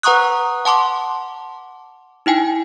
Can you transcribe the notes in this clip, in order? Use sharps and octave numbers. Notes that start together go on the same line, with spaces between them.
B4 F#5 A#5 C#6 D#6 F#6
F#5 A5 C6 D6
D#4 E4 G5 G#5